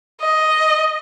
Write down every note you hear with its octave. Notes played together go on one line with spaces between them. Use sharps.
D#5